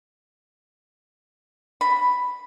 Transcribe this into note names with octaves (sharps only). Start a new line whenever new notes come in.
B5